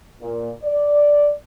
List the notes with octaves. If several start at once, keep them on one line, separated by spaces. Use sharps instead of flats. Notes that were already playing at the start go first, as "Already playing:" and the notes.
A#2
D5